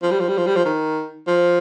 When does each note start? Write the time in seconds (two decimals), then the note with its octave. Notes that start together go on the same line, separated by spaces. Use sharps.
0.03 F3
0.11 G3
0.20 F3
0.29 G3
0.37 F3
0.47 G3
0.56 F3
0.65 D#3
1.27 F3